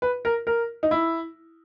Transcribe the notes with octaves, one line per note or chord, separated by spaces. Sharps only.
B4
A#4
A#4
D#4
E4